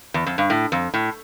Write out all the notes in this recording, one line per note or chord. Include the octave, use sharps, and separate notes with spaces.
E2
F2
G2
A2
F2
A2